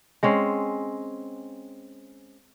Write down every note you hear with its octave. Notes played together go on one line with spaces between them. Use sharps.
G#3 C4 C#4